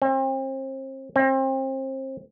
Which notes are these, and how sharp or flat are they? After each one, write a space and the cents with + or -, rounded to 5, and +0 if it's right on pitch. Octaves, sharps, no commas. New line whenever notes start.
C4 +35
C4 +30